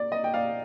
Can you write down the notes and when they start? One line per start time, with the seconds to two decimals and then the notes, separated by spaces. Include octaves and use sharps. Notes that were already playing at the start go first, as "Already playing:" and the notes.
Already playing: D5
0.12 D#5
0.24 G5
0.34 D5 F5